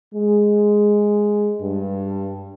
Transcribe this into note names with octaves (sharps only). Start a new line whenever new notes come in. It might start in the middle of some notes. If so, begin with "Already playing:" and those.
G#3
G2